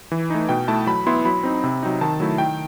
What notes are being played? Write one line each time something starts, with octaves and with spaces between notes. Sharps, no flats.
E3
A3 D#4
B2 G5
A3 E4 A5
F#3 B5
B3 E4 C6
F#3 B5
C4 D#4
C3
F#3 C4 D#4
D#3 A5
F#3 A3 E4
D#3 G5